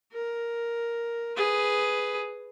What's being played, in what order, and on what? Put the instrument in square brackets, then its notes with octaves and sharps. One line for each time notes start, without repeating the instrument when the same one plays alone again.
[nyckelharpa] A#4
G#4 B4